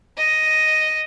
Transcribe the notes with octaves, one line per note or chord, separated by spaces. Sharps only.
D#5